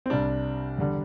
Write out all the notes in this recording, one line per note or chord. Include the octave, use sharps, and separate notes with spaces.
C4
C2 C3 G3 D4
E2 D3 G3